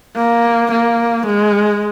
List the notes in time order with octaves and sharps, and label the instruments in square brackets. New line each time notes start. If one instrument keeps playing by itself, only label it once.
[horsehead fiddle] A#3
A#3
G#3